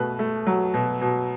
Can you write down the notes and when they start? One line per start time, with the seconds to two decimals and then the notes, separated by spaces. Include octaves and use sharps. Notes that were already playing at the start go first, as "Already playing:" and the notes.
Already playing: B2 A3 B4
0.19 A3
0.47 F#3
0.74 B2
1.01 B2